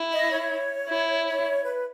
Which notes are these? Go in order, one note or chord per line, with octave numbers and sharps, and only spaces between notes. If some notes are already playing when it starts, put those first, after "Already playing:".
Already playing: E4
D#5
C#5
E4
C#5
B4